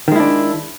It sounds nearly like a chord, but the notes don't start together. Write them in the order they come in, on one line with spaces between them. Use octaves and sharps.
D#3 G#3 E4 D4